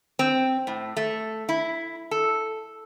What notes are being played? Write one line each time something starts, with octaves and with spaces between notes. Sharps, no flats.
C4
A2
A3
E4
A4